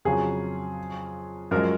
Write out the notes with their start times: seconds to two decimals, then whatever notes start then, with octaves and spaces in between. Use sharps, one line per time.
0.05 F2 C#3 F#3 G#4
1.51 F#2 F3 G#3 A#4